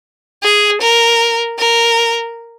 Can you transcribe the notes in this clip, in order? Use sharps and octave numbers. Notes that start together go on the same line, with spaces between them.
G#4
A#4
A#4